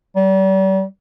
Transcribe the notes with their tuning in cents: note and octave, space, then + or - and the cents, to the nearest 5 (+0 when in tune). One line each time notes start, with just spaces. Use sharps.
G3 -40